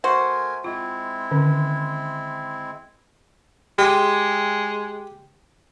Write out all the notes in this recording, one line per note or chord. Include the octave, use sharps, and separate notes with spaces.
A3 F#4 A#4 C5 G#5
G#3 C4 E4 F4
D3 D#3 C#4
G#3 G4